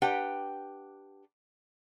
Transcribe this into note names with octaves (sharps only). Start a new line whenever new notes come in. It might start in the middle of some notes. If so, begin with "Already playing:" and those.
D4 G4 B4 F#5 G5